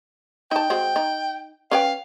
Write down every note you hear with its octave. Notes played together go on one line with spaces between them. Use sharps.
D#4 G5 A5
G#3 C4 F#4
D#4
C#4 B4 F5 G5